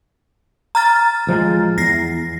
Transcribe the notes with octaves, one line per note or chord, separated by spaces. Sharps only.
A#5 F6 A6
A1 F3 G#3
E2 A#6 C7